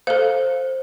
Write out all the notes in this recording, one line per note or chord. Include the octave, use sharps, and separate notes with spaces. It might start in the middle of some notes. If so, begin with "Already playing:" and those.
A4 C5 F5